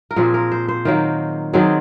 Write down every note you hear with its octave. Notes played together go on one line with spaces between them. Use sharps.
A#4
A#2 F3 C4 G#4
A#4
C5
C5
D#3 F#3 A#3
D#3 F#3 C4 G#4